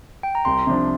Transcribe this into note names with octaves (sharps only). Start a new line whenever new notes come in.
G5
A#5
C2 C6
C3 F3 D4